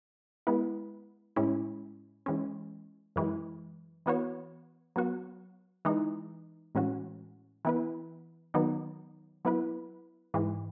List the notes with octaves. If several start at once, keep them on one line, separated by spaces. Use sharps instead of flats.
G#3 B3 E4 B4
A2 G#3 C#4 E4
E3 G#3 C#4
F#2 E3 G#3
E3 B3 F#4 C#5
F#3 B3 F#4
E3 G#3 D#4
A2 E3 G#3 C#4 F#4
E3 B3 E4 B4
D#3 F#3 B3 D#4
F#3 B3 E4 B4
G#2 E3 G#3